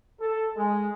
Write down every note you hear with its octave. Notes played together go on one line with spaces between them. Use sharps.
A4
G#3